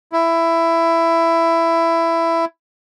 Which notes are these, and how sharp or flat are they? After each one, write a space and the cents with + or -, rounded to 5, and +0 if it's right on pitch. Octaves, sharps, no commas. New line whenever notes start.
E4 +15